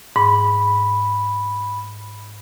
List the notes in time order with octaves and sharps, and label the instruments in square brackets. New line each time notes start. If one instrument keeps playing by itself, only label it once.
[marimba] G#2 [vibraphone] B5